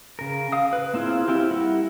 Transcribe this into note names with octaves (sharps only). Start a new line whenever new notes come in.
C#3 A#4
F5 D#6
B4
A#3 C4 E4 F4 G#4
C4 E4 F4 G4
G3 E4 A#4 F#5